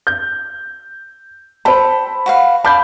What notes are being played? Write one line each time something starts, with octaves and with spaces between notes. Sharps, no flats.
G6
A4 C5 G5 B5
F#4 B4 F5
D5 F5 A5 B5 G6